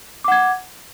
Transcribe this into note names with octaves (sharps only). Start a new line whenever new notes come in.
F#5 D6 G#6